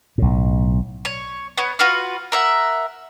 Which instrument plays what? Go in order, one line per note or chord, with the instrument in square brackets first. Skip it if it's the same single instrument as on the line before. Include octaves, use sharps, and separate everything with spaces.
[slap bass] B1 A2
[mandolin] C#5
B3 C#5
F4 F#4 B4 F6
A#4 E5 F#5